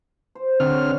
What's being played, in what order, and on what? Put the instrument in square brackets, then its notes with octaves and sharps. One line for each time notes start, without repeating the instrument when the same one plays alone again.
[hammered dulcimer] C5
[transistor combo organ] D3 C4 F6 [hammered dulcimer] C#5 F#5
[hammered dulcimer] E3 D5 C#6